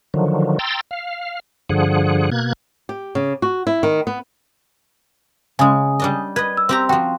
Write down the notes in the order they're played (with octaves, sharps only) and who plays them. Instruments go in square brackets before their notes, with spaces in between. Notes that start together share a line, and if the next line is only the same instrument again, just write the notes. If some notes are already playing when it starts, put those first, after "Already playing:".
[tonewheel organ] D3 D#3 F3 F#3
G5 A#5 C6 E6 A6
F5
G2 D3 F3 G#4 F#5
B2 A#3 F#6 G#6
[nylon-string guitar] G4
C#3
F#4
E4
D#3
B3
[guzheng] C#3 G#3 [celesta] G#5 D#6
[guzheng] G3 D4 D#5
[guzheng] B4 D#5 [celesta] G#6
[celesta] E6
[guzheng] C4 G4 A#5
[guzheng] F3 F#4 [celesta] G5